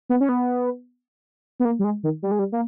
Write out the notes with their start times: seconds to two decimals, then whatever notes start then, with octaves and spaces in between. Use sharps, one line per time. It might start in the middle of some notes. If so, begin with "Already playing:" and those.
0.10 B3
0.21 C#4
0.29 B3
1.60 B3
1.65 A#3
1.79 G3
1.84 G#3
2.03 D#3
2.23 G3
2.31 G#3
2.39 G3
2.52 A#3